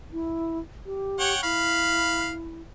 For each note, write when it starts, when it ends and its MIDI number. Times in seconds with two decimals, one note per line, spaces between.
0.13 0.59 64
0.86 1.34 67
1.20 1.39 73
1.20 1.39 78
1.20 1.39 79
1.43 2.62 64
1.43 2.33 77
1.43 2.33 83